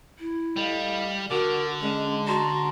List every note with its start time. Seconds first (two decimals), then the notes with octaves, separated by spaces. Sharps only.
0.19 E4
0.56 A2 G3 D#5 F5
1.31 D3 F#4 A#4 D6
1.81 G#3 C#4 D4
2.28 F#4 A5 A#5 C6